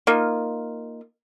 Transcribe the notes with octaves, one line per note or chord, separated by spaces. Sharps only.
A#3 D#4 F4